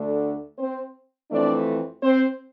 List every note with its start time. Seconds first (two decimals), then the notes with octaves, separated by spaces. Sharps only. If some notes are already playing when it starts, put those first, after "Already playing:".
Already playing: D2 D3 A3 D4
0.58 C4 C5
1.31 F2 E3 A3 C4 D4 D5
2.02 C4 C5